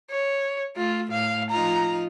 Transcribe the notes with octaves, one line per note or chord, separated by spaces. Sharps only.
C#5
A3 F4
A2 F5
F3 D#4 F4 A#5